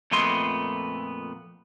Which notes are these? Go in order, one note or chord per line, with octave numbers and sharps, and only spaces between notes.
F2 A#2 A3 B3 D#5 C6